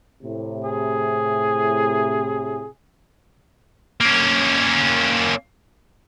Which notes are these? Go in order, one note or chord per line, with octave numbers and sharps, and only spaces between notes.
A2 C3
G#4
A#3 C#4